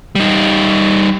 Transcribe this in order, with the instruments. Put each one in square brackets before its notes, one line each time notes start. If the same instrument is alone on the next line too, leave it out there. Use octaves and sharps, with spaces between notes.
[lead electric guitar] G3 D#4